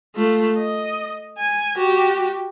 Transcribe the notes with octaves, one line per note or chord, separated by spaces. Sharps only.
A3 F4
D#5
G#5
F#4 G4